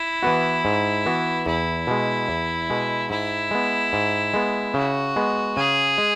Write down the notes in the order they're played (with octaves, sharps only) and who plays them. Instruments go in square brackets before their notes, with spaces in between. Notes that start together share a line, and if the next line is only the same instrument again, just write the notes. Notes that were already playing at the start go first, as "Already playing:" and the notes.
Already playing: [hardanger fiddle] E4
[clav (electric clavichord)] E3 B3 F#4
G#2
E3 B3 F#4
[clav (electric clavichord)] E2 [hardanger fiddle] E4
[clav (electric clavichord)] B2 G#3
E2
B2 G#3
[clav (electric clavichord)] G#2 [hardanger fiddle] E4
[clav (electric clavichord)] G#3 B3
G#2
G#3 B3
[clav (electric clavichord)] C#3 [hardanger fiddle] F#4
[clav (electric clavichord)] G#3 B3
[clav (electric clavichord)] C#3 [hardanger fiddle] G#4
[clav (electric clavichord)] G#3